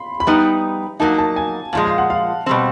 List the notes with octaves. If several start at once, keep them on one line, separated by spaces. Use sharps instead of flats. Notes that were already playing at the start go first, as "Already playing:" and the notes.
Already playing: B5 C6
B5
G3 B3 D#4 A#5
F#3 A#3 D#4 A5
A5
G#5
A#2 F3 G#3 A5
F5
F#5
F5
B2 G3 C4